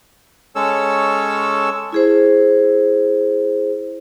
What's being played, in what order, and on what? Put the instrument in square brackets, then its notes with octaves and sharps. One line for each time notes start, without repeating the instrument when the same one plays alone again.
[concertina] G#3 C#4 A4 C#5 E6
[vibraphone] E4 G#4 C5